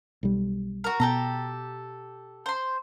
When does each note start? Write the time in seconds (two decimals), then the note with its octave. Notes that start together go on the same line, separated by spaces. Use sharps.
0.23 B1 G3
0.84 F#4 A#4
1.00 B2 G4 A4 A#5
2.46 C5 C6